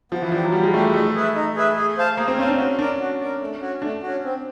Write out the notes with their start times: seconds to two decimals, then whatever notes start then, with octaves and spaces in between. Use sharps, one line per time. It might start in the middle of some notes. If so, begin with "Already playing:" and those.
0.12 F3 B3
0.22 E3
0.32 F3 D4 G4
0.43 F#3
0.52 G3 B3
0.63 G#3
0.73 A3 D4 G4
0.84 G#3
0.94 A3 D#4
1.14 G#4 B4 E5
1.35 D#4
1.56 G#4 B4 E5
1.77 G#4
1.97 C5 F5 A5
2.17 A#3 G#4
2.28 C4
2.38 C#4 C5 F5 A5
2.48 D4
2.58 C#4 F#4
2.79 D4 A#4 D5
3.00 F#4
3.20 A#4 D5
3.41 A3
3.61 C#4 F#4
3.82 A3 D4
4.03 C#4 F#4
4.24 C4